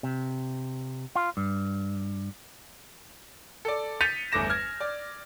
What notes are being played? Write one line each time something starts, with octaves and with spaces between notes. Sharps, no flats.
C3
F4
G2
A4 D5
G6 A6 B6 C#7 D#7 F7
G1 E2 A3 D6 A#6 E7
F6 G#6
D5